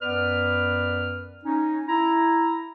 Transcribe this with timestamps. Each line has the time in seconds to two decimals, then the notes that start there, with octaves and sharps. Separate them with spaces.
0.02 F#2 B3 B4 D5 F6
1.45 C#4 D#4
1.87 E4 A#5